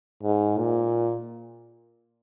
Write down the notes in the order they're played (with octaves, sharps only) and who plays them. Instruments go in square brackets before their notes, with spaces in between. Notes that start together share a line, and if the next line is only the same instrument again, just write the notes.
[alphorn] G#2
A#2